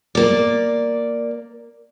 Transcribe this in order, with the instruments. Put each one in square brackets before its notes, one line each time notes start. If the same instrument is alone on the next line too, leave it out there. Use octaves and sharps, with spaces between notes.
[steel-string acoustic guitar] A#3 D5